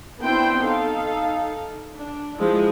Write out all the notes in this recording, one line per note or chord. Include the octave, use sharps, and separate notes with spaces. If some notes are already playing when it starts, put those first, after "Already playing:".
B3 C4 D4 E4 G5 C6
D#4 A4 F5
D4
F3 G#3 E4